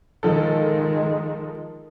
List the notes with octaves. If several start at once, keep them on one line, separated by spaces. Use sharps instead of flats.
D#3 F3 G#3 A4